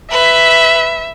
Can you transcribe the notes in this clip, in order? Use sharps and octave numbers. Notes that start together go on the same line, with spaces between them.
B4 E5